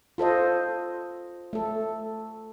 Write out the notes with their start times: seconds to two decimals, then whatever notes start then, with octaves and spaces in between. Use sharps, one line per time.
0.18 F4 A4 C5 D#5
1.53 A3 A4